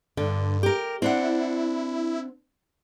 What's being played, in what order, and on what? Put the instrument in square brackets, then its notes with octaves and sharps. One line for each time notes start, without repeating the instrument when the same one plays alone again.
[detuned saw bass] G2 [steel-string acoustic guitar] D3
[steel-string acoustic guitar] G4 A#4
[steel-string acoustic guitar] C4 D4 F#5 [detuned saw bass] E4